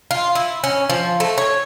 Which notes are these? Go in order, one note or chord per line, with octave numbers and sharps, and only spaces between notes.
F4
E4
C#4
F3
A3
C#5